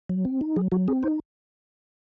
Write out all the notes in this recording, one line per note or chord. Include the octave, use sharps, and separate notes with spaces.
F#3
C4
D#4
F#3 G#4
F#3 F#4
C4 G#4
D#4 C5